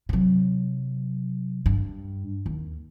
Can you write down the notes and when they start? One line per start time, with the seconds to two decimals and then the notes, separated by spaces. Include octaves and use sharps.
0.09 C3 F#3
1.66 G2
2.46 D#2